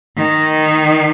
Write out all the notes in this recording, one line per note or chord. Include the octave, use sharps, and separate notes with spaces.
D#3